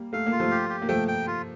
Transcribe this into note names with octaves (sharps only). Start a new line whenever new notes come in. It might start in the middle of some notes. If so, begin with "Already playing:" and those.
Already playing: G3 A#3
A3 F5
A#3
F4
F3 A3
G4
G4
A#3
F3 A3 G5
G5
F4